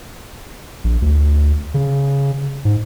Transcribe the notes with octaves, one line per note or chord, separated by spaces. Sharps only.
A#1
D2
C#3
G#2